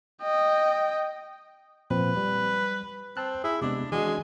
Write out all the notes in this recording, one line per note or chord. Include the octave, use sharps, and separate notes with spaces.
D#5 G5
A#2 F3 C4 B4
G3
C4 A5 F#6
E4 G#4
C3 G#3 B3 D4
E3 G#3 D4 F#4